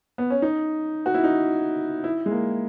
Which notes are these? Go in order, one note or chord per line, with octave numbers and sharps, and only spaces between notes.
B3
C#4
D#4
F#4
E4
D#4
E4
G#3
A#3